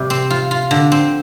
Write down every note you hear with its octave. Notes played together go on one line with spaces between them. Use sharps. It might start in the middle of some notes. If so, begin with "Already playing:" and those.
Already playing: C3 G3
C4
F4
F4
D3
C4